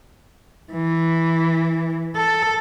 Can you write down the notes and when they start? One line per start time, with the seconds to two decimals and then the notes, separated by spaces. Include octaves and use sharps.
0.73 E3
2.16 A4